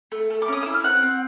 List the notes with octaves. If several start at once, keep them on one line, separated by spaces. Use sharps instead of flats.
A3
A3
D6
C#4 D#6
E4 E6
F6
C4 F#5 F#6
C4